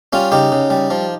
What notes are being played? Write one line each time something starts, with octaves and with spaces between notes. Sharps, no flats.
G3 C#4 F4
C#3 D#4 G4
C#3
G3
F3